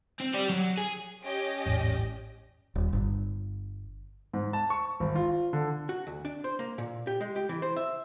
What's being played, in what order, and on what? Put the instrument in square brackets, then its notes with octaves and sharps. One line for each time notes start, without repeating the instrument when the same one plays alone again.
[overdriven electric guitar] C4
G4 D5
F#3
G#4
[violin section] C#4 G4 D#5
[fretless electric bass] A1 E2 G#2
[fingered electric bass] D#1
G1
[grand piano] G#2
A5
C#6
G#1
F4
D3
[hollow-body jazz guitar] F#4
D2
D4
C5
A#3
A#2
G4
G#3
G4
E3
C5
E5